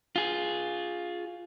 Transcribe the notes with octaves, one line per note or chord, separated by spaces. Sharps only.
F4 G#4